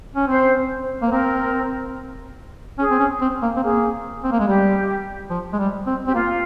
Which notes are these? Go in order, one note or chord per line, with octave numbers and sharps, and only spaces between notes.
C#4
C4 C5
A#3
C5
C4 A#4
C#4 G#4
C4
C#4
C4
A#3
C4
A#3 G#4
C4
A#3
G#3
G3 G4
F3
G#3
G3
C4
C4 G4
A#3 F4